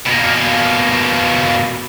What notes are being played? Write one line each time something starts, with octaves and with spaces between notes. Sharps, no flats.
B2 A#3